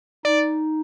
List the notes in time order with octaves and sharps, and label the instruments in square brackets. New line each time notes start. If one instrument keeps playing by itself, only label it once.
[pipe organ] D#4 [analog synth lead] D5